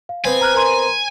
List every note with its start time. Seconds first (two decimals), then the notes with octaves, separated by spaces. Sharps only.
0.09 F5
0.25 B3 C4 G#5
0.41 A#5 F6 F#6
0.55 A#4 A#5 C6